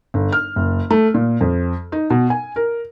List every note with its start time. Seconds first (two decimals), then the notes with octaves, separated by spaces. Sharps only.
0.14 G1
0.32 F6
0.56 F#1
0.90 A3
1.14 A#2
1.41 F2
1.92 D#4
2.10 B2
2.30 G#5
2.56 A#4